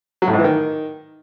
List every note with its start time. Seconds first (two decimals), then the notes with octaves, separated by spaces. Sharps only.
0.22 F#3
0.28 A2
0.33 G#2
0.39 E3
0.44 D#3